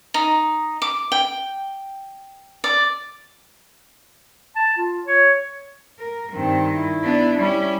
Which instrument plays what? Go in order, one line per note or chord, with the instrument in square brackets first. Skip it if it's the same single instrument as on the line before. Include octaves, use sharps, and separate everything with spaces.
[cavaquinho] D#4
D6
G5
D5
[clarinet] A5
F4
C#5
[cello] A#4
[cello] G2 D#3 [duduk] C4
[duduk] E4
[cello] B3 D4
[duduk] G3 [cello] C#4 E4